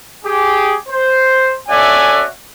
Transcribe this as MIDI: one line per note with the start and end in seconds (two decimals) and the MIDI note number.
0.25 0.75 67
0.25 0.75 68
0.87 1.55 72
1.69 2.25 61
1.69 2.25 66
1.69 2.25 69
1.69 2.25 74
1.69 2.25 76
1.69 2.25 80